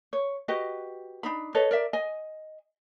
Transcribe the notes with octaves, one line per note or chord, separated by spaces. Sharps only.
C#5
F#4 G4 B4 D#5
D4 D#4 B5
A4 B4 C#5 D#5
A#4 D5 E5
D#5 G#5